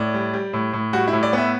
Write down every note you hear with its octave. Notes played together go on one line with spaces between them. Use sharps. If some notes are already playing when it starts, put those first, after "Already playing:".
Already playing: A2 D5
G3
G3
A2
A2
G3 F#4
E4
A2
D5
B3 E5